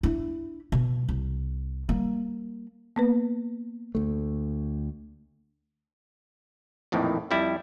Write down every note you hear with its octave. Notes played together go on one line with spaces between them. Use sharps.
D4 E4
B2
C2
G3 A#3
A#3 B3 B4
D2 A3
A#1 F2 A2 D#3 E3
F2 G3 E4